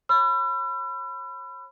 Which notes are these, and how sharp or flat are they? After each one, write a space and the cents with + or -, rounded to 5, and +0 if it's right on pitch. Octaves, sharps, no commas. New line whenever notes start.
C#5 -40 B5 +15 E6 +45